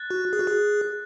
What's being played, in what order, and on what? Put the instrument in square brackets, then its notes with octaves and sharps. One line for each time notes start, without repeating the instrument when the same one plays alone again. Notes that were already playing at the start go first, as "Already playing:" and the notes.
Already playing: [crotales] F#6 A6
[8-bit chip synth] F#4
G#4
F#4
G#4